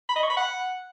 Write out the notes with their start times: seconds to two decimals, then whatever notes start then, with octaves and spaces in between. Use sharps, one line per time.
0.09 B5
0.16 D#5
0.23 C#6
0.30 B5
0.37 F#5